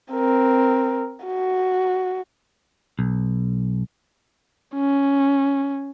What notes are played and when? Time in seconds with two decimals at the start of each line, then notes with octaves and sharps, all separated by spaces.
0.12 C4 A#4
1.25 F#4
2.99 B1
4.75 C#4